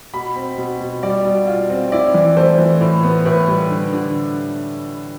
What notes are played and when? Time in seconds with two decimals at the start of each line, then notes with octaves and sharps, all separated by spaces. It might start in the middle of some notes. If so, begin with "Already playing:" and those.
0.13 B2 B5
0.36 C4
0.58 B2
0.80 B2
1.03 G3 D5
1.25 B2
1.47 F4
1.70 C4
1.92 E4 D5
2.14 E3
2.37 A3 C5
2.59 E3
2.81 A2
3.03 B3
3.25 A2 B4
3.48 G3
3.70 D3
3.92 D3